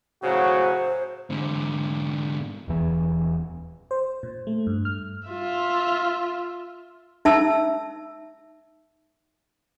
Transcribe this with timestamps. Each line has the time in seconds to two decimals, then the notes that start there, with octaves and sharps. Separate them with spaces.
0.23 A2 C#3 F#3 F#4 C5
1.30 G#2 D3
2.68 D#1 E2 E3
3.91 C5
4.23 A#2
4.47 A3
4.67 G2
4.85 F6
5.28 F4 E5
7.25 D#4 E5 A5 E6